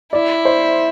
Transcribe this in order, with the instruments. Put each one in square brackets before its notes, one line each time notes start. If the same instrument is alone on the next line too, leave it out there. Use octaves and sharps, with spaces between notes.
[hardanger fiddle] E4 [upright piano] D5
[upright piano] C5